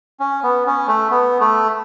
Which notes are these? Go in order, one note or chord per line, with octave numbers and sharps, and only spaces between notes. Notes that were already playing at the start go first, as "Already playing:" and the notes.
C#4
B3
C#4
A3
B3
A3